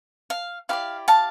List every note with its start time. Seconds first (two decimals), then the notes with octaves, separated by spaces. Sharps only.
0.30 F5
0.69 E4 G4 B4 D5 F5
1.08 F5 A5